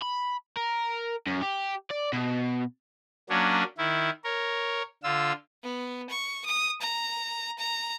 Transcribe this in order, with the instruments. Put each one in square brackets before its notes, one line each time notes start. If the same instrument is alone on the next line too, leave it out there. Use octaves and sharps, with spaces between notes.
[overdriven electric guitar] B5
A#4
F#2
G4
D5
B2
[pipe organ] F#3 A#3 C#4 D4
D#3 E4
A#4 C#5
D3 F4 E6
[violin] B3
C#6
D#6
A#5
A#5